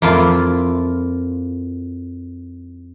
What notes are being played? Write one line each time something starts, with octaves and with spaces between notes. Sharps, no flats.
F2 A#3 E4 F4